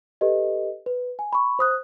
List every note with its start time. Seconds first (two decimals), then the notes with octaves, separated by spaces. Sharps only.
0.21 G4 A4 B4 D#5
0.86 B4
1.19 G#5
1.33 B5 C#6
1.59 C5 D#6 F#6